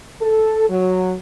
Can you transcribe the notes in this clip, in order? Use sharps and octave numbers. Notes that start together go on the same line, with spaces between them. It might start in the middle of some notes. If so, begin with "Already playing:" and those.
A4
F#3